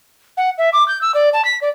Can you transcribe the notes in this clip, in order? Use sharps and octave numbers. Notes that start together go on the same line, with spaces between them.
F#5
E5
D6
G6
E6
D5
A5
B6
D5